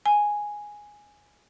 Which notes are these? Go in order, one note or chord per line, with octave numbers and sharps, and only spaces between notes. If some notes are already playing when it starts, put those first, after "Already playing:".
G#5